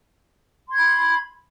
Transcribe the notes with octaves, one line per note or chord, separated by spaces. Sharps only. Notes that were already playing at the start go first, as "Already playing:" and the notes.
B5 C6 G#6